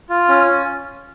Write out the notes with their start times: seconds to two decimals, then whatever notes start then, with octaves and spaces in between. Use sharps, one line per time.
0.10 F4
0.29 C#4